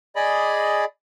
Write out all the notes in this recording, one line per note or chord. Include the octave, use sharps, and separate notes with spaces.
G#4 D5 D#5 B5